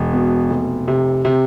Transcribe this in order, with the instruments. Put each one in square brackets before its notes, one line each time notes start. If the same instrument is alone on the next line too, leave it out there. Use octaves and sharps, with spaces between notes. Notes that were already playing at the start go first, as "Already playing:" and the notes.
Already playing: [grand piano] E1
B2
F1
C3
C3